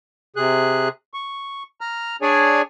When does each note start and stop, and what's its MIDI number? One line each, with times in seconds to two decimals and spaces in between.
0.36 0.88 48
0.36 0.88 68
0.36 0.88 90
1.14 1.63 85
1.81 2.16 82
1.81 2.16 89
2.22 2.62 62
2.22 2.62 68
2.22 2.62 73
2.22 2.62 74
2.22 2.62 80